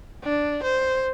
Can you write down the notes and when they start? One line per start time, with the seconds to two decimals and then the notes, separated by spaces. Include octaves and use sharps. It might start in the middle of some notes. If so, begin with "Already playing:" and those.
0.24 D4
0.63 C5